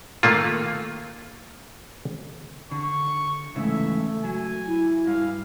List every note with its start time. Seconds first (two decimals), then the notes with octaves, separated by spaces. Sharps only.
0.23 D#3 A3 A#3 F4
2.71 D3 C#6
3.55 G#2 C#3 E3 A3 E5
4.24 F#3 G#5
4.66 E4
5.07 G2 F5